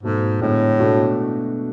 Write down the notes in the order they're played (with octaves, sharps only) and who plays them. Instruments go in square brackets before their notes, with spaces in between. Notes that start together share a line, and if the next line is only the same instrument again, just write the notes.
[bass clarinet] G#2 [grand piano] B2 F#3 A3
[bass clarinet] A2 [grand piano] D3 G#3 B3
[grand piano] B2 A3 D4 F#4